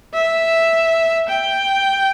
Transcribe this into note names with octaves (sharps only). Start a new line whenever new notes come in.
E5
G5